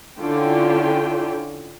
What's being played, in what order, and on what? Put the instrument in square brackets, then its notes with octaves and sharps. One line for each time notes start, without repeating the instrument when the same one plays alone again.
[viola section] D3 C#4 E4 F4 G5